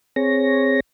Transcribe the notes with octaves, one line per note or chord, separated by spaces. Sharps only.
C4 G#4 C#5 A#6